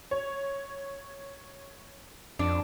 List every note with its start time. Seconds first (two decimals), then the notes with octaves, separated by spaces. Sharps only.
0.11 C#5
2.39 F2 D4